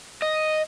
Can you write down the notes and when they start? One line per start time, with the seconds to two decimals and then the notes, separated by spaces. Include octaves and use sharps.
0.22 D#5